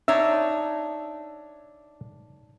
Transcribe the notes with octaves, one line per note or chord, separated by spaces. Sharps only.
D4 D#4 C#5 E5